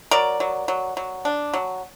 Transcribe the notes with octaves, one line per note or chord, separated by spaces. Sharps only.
F#3 A#4 D5
F#3
F#3
F#3
D4
F#3